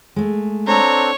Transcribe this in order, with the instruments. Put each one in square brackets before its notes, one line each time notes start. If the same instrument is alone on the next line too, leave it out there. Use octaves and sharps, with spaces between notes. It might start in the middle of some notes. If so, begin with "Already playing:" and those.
[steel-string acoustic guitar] G#3 A3
[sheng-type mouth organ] C4 D4 A4 [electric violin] C#5 [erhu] A#5